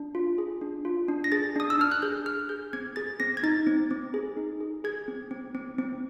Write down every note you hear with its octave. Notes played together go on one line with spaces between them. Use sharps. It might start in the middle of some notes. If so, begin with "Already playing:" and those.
Already playing: D4
F4
G#4
D4
F4
D4
A#6
G#4 A6
D4 D#6
E6
D4 F6
F#6
G#4 G6
G#4 F6
G#4 G6
C4 G#6
G#4 A6
C4 A#6
G#6
D#4 A6
C4
C4
G#4
D#4
G#4
G#4 G#6
C4
C4
C4
C4